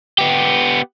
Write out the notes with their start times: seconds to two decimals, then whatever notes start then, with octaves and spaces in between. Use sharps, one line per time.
0.18 B3 G4